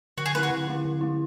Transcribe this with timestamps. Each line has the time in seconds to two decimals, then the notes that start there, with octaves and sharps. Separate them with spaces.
0.18 D3 F#4
0.26 G#4
0.35 A3 B4
0.37 E4
0.43 F#4
0.50 D3
0.67 A3 E4
0.85 D3
1.01 A3 E4